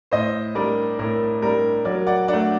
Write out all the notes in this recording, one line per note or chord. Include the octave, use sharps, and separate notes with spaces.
A2 C5 D#5
G3 D4 A#4 D5
A2 A#4
G3 D4 A#4
F#3 A#4 D5
D5 F#5
A3 D4 D5 F#5